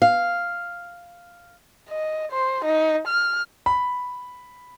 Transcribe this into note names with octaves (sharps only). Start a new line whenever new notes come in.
F5
D#5
C5
D#4
F6
B5